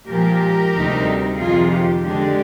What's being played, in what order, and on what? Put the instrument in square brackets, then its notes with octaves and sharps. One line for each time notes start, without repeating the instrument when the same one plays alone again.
[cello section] A#2 F3 G#3 G4 A#4
D2 C3 G3 C4 D#4
F2 C3 D#3 F4 G#4
G4
D3 G#3 D4